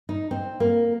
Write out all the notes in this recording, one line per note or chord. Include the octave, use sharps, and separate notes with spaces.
D#4
C4
A#3